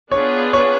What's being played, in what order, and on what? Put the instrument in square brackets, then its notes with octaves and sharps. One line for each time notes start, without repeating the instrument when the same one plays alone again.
[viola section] B3 D4 F4 G#4 B4 [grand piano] C#5
[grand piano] C#5